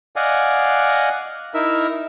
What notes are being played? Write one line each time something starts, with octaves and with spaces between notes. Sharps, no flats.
D5 D#5 F5 F#5 G#5
D#4 E4 A#4 E5